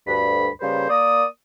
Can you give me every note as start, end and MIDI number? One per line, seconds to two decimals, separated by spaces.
0.07 0.49 38
0.07 0.49 43
0.07 0.49 83
0.61 0.89 49
0.61 0.89 55
0.61 0.89 58
0.61 0.89 71
0.61 0.89 72
0.90 1.25 58
0.90 1.25 74
0.90 1.25 87